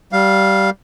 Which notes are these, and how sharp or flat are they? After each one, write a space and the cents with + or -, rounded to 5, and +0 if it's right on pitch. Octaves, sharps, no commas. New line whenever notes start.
G3 -15 F5 +0